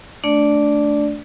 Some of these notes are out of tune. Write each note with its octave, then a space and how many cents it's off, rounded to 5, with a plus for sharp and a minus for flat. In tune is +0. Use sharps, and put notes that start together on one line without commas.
A3 +0 D4 -10 D5 +0